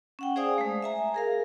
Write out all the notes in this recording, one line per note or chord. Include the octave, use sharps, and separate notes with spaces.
C#4 F#5 G5
G#4 C5 D5 F5 G#5 D#6
G#3 A3
E5 G#5 A#5
G#4 A#4 F5